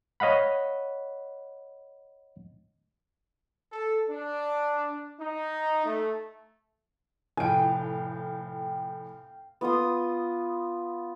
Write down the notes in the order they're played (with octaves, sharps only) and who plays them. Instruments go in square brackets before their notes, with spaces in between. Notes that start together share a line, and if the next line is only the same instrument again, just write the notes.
[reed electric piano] C#5 D#5 F5 F#5 B5
[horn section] A4
D4
D#4
A3
[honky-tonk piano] F1 A2 D7 [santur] F5 G5 [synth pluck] G#5
[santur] B3 F4 C6 D#6